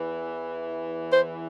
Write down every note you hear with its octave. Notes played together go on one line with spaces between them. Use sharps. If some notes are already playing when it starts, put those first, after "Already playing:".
Already playing: E2 E3
C5